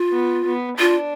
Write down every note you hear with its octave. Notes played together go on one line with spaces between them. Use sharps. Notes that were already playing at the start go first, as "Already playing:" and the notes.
Already playing: F4
B3
B3
D4 F4